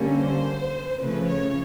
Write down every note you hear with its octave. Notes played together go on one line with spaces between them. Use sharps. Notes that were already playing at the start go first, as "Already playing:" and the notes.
Already playing: D3 G3 A#3 C#4
C5
C#3 F3 A3 B4
C#5